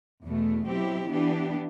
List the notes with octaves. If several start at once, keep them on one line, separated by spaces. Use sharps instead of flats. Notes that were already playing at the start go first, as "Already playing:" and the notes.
E2 B2 A3
B2 F#3 C4 E4 G4
E3 B3 D4 G4